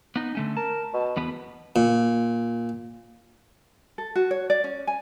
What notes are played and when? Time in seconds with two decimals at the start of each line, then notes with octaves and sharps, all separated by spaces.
0.16 B3 D#4
0.35 D3 A3 C#4
0.57 A#4 A5
0.94 B2
1.17 E2 B3 B4
1.76 A#2
3.98 A4
4.16 F#4
4.31 C#5
4.50 D5
4.64 C#4
4.87 G#5